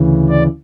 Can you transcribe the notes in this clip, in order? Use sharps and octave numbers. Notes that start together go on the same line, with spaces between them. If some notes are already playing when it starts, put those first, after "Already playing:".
Already playing: D2 C#3 E3
D5